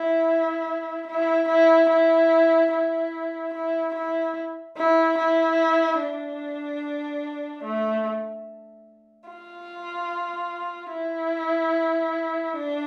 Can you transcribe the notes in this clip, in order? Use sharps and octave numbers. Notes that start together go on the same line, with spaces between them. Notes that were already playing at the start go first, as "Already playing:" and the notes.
Already playing: E4
E4
E4
E4
E4
E4
E4
E4
E4
D4
A3
F4
E4
D4